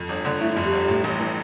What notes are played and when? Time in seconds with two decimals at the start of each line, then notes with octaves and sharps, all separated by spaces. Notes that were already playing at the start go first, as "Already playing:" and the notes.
Already playing: F2
0.09 G1
0.25 D3
0.41 A3 E4
0.57 F2
0.65 G4
0.72 G1
0.88 A2
1.04 A1
1.20 E3